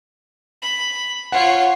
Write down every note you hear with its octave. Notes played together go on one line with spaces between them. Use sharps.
B5
F4 C#5 F#5